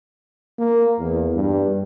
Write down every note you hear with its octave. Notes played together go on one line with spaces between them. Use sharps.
A#3
E2
G2